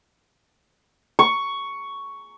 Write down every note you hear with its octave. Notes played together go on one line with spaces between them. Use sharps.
C#6